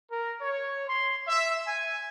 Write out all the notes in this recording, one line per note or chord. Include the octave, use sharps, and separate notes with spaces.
A#4
C#5
C6
E5
G#5